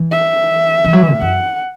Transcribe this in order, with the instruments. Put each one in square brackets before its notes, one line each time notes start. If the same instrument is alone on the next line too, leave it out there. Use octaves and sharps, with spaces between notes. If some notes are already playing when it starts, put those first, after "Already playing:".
Already playing: [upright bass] E3
[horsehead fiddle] E5
[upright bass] E3
F#3
E3
A2
[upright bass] F#2 [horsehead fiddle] F#5